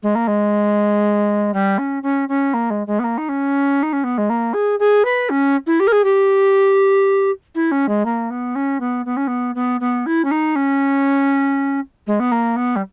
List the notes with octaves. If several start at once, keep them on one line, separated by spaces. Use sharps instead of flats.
G#3
A#3
G#3
G3
C#4
C#4
C#4
A#3
G#3
G#3
B3
A#3
D#4
C#4
D#4
C#4
B3
G#3
A#3
G#4
G#4
B4
C#4
E4
G4
A#4
G#4
G4
E4
C#4
G#3
A#3
B3
C#4
B3
B3
C#4
B3
B3
B3
E4
C#4
D#4
C#4
G#3
B3
A#3
B3
G3